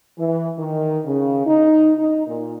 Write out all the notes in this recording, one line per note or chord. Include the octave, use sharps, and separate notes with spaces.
E3
D#3
C#3
D#4
D#4
A#2